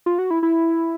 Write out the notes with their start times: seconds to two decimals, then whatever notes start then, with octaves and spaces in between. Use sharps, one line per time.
0.06 F4
0.19 F#4
0.30 E4
0.43 E4